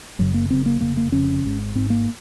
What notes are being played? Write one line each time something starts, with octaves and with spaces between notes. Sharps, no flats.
F#1 F#2 C#3 F#3
A#3
F#1 F#2 C#3 C4
A#3
F1 F2 C#3 A#3
A#3
F1 F2 C#3 C#4
G#1 G#2
G#1 G#2 C4
A#3